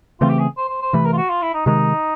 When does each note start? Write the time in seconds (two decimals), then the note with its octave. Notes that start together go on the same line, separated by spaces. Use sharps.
0.21 C#3 E3 A3 C4 F4
0.30 G4
0.39 G#4
0.57 C5
0.69 C5
0.82 C5
0.93 C3 E3 A3 B4
1.05 A#4
1.13 F4
1.17 F#4
1.29 F4
1.42 E4
1.54 D#4
1.66 C3 D#3 G#3 D#4